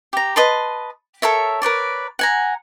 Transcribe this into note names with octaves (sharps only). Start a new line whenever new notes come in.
G4 A#5
B4 D#5 A5 C6
A4 A#4 C#5 E5
A#4 B4 C#5 D5
F#5 G#5 A#5